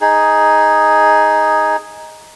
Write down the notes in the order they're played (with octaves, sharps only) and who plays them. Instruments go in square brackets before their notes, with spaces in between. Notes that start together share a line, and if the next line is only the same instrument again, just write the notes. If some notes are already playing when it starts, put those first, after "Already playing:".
[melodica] D#4 G#4